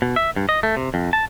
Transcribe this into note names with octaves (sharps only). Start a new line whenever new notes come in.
B2
E5
G2
D#5
A3
C3
F2
A5